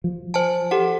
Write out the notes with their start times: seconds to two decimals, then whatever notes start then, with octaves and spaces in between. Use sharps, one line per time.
0.04 F3
0.34 C5 G#5 A5
0.71 G4 A4 F#5